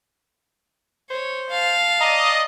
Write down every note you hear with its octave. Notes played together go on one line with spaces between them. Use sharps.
C5 C#5
F5 A5
D5 D#5 A#5